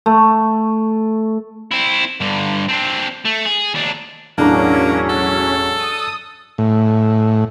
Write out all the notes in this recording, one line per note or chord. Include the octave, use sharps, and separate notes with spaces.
A3
C4 E4
G2 D3
C4 D4
A3
G#4
D#2 D4
E1 A2 F#3 A#3 C#4 D4 A#5
A4
D#6
A2